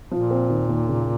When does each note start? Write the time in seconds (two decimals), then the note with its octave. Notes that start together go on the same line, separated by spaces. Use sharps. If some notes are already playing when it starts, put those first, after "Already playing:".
0.11 A#2 F3
0.31 C4
0.49 D#2
0.69 D#2
0.88 C#3